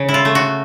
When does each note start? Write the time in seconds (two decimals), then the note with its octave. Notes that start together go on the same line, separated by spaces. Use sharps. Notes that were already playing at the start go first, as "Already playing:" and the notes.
Already playing: C#3
0.09 E4
0.14 F4
0.25 A3
0.35 F#4